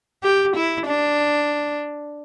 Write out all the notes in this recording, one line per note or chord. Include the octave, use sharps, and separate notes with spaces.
G4
E4
D4